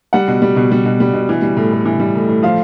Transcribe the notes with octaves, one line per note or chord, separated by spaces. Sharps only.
G3 F#5
B2
G3
B2
G3
B2
G3
B2
E3
G3
A2
A2
E3
G3
A2
A2
F3 F5